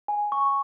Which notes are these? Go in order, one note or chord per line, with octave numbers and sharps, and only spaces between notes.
G#5
C#6